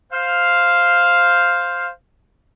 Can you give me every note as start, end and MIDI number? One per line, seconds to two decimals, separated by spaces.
0.12 1.89 72
0.12 1.89 77